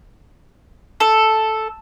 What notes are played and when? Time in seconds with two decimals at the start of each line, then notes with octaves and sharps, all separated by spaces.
1.00 A4